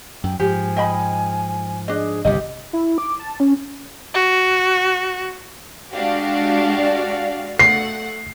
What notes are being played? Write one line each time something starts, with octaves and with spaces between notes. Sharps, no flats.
F#2 G5
G#2 F3 G4 G#5
D#5 G5 B5
D4 G#4 D#5
G1 C2 C3 G4 D#5
E4
D6
A5
C#4
F#4
G#3 D4 F#4 G4 D5 F5
A3 F#5 C7